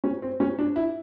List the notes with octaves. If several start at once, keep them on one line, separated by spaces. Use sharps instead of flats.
C#4
C4
C#4
D4
E4